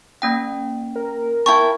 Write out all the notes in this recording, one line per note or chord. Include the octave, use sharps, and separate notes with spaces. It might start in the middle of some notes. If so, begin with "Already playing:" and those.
A#3 C#4 G5
A#4
E4 G5 A5 C#6